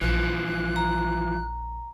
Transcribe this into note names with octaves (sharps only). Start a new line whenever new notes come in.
A#1 E3 F3 F#6
A#5